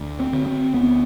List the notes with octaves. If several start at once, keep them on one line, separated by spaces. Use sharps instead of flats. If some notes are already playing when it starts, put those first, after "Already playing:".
Already playing: D2
C4
D3
C4
D2 B3